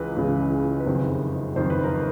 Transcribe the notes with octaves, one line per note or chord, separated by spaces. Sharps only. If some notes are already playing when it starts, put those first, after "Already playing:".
Already playing: C#2 C#3 E3 B4
C#2 C#3 E3
B4
F#1 F2 C3 D#3 C5
F#1 F2 C3 D#3 C5
B4
A#4